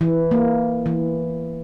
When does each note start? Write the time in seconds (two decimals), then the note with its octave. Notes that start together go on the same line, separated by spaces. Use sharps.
0.01 E3
0.31 A#3
0.86 E3